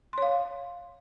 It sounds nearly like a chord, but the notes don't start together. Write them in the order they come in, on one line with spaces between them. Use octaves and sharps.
C6 C#5 F5